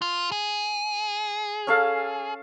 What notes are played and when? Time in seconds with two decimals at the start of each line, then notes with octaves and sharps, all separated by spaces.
0.02 F4
0.32 G#4
1.67 C#4 A4 F5